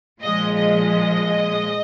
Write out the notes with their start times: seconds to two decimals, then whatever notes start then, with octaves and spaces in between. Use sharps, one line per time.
0.21 A#2 F3 G#3 D#5
0.57 D#5